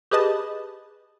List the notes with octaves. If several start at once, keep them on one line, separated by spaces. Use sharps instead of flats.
G4 G#4 B4 D#5 A5